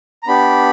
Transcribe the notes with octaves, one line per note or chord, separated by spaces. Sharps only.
A#5
B3 D4 G4 B5